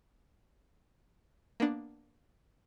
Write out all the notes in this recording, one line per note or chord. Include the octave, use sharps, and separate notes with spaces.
A#3 B3 D4